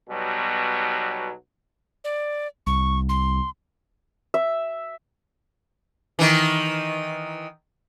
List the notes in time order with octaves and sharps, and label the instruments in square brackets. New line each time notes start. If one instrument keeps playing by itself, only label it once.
[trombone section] B1 B2 F#3 G3
[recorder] D5
[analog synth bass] C2 [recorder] C#6
[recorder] C6
[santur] E5
[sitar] D#3 E3